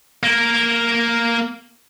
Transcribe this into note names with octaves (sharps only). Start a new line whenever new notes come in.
A#3 A#4